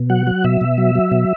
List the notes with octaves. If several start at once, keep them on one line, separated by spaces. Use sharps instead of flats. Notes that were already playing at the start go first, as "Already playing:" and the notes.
Already playing: B2
F#3 F#5
F#3
B2 E5
B2
F#3
F#3
B2